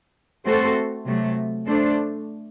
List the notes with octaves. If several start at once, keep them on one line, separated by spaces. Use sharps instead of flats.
A3 C4 F#4 A4 C5
C3 F#3 A3
A3 D4 A4 C5